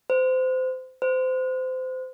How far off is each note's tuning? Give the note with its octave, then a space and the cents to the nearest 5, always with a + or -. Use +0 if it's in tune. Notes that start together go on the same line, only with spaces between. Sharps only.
C5 -25
C5 -25